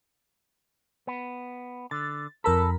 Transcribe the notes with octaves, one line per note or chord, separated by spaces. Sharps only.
B3
D3 A6
F2 A4 A#4 B5